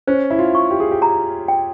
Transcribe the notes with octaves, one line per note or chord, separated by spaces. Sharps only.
C#4 C5
E4
F4
C#6
G4
G#4
G4
A#5
G5